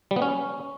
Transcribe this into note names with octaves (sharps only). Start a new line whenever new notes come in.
G3
B3
C#4